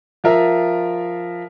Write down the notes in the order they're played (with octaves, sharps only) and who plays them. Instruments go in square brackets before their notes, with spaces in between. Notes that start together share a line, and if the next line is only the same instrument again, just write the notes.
[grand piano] F3 F4 A#4 E5 F5